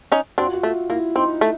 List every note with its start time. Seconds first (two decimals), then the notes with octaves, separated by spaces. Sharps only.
0.12 C#4 D#4
0.38 C4 D4 F#4
0.46 F4
0.53 F#4
0.63 A3 F4
0.90 A#3 E4
1.16 C4 D#4
1.41 A3